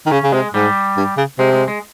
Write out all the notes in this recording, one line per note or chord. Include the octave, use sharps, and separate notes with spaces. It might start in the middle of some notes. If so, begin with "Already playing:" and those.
D#3
C#3 C#4
C#3
C3 G#3
G#2 G3
G2
C#3
C3 G#3
G#3
G#3